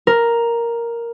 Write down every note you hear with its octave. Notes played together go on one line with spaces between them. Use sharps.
A#4